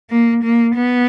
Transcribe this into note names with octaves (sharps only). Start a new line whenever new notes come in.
A#3
A#3
B3